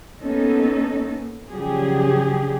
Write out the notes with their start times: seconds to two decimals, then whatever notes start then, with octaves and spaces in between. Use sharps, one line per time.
0.21 A#3 B3 C#4 D#4 A4
1.52 C#3 F3 F#3 D4 G4 G#4